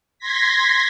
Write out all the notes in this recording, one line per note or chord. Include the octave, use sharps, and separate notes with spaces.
C6 G#6 A#6 B6